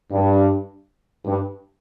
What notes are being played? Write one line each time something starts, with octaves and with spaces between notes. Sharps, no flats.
G2
G2